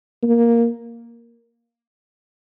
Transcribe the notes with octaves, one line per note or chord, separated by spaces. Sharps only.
A#3